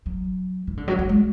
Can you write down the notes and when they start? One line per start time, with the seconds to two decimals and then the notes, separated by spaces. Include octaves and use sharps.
0.06 F#3
0.67 E3
0.77 D3
0.88 F#3
0.99 F#3
1.09 G#3